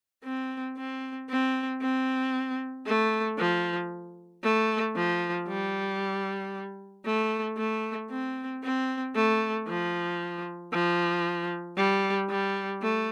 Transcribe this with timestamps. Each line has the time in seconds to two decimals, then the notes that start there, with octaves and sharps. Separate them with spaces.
0.24 C4
0.77 C4
1.29 C4
1.81 C4
2.86 A3
3.38 F3
4.43 A3
4.95 F3
5.48 G3
7.05 A3
7.57 A3
8.10 C4
8.63 C4
9.15 A3
9.67 F3
10.73 F3
11.76 G3
12.29 G3
12.82 A3